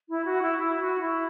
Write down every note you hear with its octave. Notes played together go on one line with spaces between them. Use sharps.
E4
F#4
E4
E4
F#4
E4